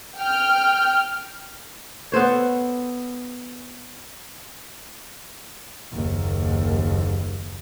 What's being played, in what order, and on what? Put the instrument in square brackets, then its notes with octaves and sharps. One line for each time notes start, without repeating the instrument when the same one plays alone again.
[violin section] G5 F6
[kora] B3 A4 C5 C#5
[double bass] F#1 D#2